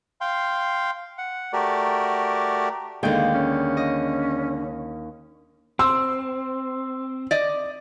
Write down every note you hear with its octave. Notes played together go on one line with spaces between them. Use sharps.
F5 G5 C6
F#5
A3 F#4 G4 A#4 D5
D#2 D3 G#3 G5
C#4
D#5
C4 C6 E6
D5 D#5